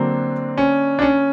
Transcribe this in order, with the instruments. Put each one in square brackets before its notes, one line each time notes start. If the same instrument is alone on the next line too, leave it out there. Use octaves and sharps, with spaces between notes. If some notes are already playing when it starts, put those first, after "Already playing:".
Already playing: [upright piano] D3 F#3 A#3 D4 [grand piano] C4
[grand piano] C#4
D4
C#4